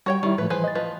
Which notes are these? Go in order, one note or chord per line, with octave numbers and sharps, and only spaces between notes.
G3 F#4 C#5 G5
D#3 G3 E4
A2 F3 A3 B4
E3 G#4 B4 C5
D#5 A6
F3 B4